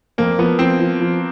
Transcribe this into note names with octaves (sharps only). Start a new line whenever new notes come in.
F2 A#3
F3 B3
F3 C4
F3
F3